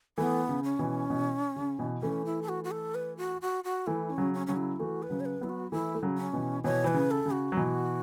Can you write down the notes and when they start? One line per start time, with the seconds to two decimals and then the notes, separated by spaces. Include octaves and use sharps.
0.18 E3 A3 B3
0.49 C#3
0.64 C#4
0.79 B2 E3
1.10 B2 E3
1.56 C#3
1.79 B2 E3
2.02 E3 A3 C#4
2.25 E4
2.42 A4
2.49 F#4
2.64 F#4
2.71 A4
2.95 B4
3.17 F#4
3.42 F#4
3.64 F#4
3.87 E3 A3 E4
4.10 C#4
4.18 C#3 F#3
4.34 C#4
4.47 C#3 F#3 C#4
4.57 E4
4.79 E3 A3 F#4
5.03 B4
5.10 C#3 F#3
5.20 C#5
5.25 B4
5.41 F#3 B3 E4
5.49 F#4
5.72 E3 A3 E4
5.95 A3
6.02 C#3 F#3
6.18 C#4
6.33 B2 E3
6.64 B2 E3 C#5
6.84 E3 B4
6.94 C#3
7.11 A4
7.26 C#3
7.33 F#4
7.52 F#3
7.57 B2 E3